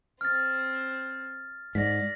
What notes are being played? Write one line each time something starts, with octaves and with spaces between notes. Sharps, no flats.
C4 F6 A6
G#2 D5 A#6 B6